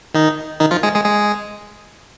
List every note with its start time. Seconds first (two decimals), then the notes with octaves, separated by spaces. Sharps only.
0.14 D#3 D#4
0.60 D#3 D#4
0.71 F3 F4
0.83 G#3 G#4
0.95 G#3 G#4
1.05 G#3 G#4